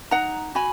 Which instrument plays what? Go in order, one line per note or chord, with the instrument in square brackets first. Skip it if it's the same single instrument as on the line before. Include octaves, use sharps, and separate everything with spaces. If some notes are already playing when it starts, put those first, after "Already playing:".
[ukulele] D#4 F#5 A#5
F#4 G#5 B5